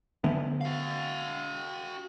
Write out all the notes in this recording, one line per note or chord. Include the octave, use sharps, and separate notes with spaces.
D3 A3 B3
F#4 F5